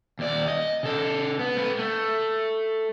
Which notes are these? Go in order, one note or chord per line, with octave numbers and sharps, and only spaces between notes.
D#2 D5
D#5
C#3 A4
B3
A3 B4
A3